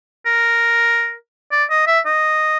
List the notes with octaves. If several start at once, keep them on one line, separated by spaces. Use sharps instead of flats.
A#4
D5
D#5
E5
D#5